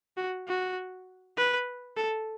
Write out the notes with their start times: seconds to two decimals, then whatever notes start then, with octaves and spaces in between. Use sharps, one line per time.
0.17 F#4
0.48 F#4
1.37 B4
1.97 A4